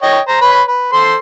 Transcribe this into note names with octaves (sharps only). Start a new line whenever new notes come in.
C#5 D#5 G5
C5 A#5
B4 C#5 B5
B4
A4 C5 C6